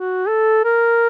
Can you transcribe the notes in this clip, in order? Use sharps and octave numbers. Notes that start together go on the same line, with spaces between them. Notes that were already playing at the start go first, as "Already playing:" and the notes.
Already playing: F#4
A4
A#4